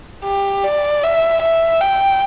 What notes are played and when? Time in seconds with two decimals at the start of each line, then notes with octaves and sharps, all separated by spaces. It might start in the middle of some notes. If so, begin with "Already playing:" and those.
0.24 G4
0.63 D5
1.03 E5
1.42 E5
1.81 G5